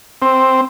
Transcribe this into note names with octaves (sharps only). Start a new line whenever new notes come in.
C4